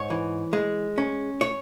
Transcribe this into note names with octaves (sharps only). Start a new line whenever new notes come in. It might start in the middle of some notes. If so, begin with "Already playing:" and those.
Already playing: G#2 C#5
E3
G#3
C#4
C#5